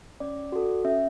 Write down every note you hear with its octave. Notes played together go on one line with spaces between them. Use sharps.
C#4 D5
F#4 A4
C#4 E5